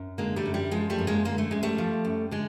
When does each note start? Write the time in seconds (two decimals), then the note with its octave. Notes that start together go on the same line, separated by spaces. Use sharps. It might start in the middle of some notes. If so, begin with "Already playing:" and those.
Already playing: F#2
0.18 D3 G#3 A#3
0.36 G3 A3
0.46 F#2
0.54 G3
0.71 F3 G#3
0.90 G3 A3
0.99 F#2
1.07 G#3 A#3
1.25 D3 A#3
1.38 A3
1.51 F#2 G#3
1.63 G3 A3
1.78 F3
2.05 F#2
2.31 D3 G#3